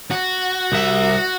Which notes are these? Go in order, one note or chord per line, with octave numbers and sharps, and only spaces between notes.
F#4
C2 E5